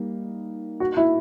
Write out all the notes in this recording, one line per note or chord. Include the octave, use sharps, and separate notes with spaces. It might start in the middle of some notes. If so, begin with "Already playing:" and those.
Already playing: G3 A#3 D#4
F#4
E4